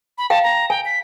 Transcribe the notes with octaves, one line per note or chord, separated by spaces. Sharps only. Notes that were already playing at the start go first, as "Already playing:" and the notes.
B5
F5 G5 A5
A#5
G5 G#5
B6